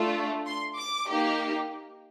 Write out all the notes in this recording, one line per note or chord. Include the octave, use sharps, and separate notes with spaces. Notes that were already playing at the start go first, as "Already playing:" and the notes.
Already playing: A3 D4 F4
C6
D6
A#3 D#4 G4